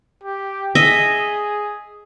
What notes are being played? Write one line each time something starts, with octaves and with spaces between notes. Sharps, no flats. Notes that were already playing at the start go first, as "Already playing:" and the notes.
G4
G#4 D#5 E5